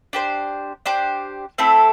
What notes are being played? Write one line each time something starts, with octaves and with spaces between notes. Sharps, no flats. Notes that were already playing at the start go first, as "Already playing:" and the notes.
D4 G4 C5
D4 G4 C5
A3 C4 E4 A4